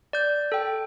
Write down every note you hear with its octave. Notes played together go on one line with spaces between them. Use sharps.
D5 G6
A4 G5